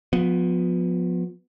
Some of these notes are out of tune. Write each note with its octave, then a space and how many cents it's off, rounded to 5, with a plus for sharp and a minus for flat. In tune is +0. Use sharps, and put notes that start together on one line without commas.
F3 +30 B3 +5